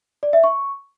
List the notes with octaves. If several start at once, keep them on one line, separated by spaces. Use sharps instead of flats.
D5
E5
C#6